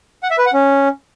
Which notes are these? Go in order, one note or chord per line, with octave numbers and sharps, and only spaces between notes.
F#5
E5
B4
F#5
C#4